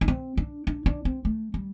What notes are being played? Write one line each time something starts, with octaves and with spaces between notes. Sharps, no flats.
D4
C4
D4
D4
D4
C4
A3
G3